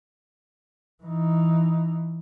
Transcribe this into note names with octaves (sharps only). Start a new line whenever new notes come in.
E3 D#4